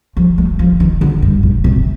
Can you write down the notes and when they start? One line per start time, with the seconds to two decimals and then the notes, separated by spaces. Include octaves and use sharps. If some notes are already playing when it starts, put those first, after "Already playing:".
0.17 F3
0.38 A3
0.59 F3
0.80 D#3
1.01 D3
1.22 G2
1.43 A2
1.64 C3